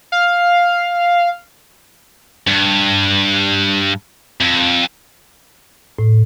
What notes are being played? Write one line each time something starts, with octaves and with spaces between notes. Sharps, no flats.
F5
G2
F2
A2